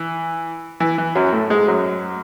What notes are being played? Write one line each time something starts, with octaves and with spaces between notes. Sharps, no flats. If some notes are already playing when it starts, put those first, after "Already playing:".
Already playing: E3
E3
E3
F#2 F#3
A2 A3
G#2 G#3
F#2 F#3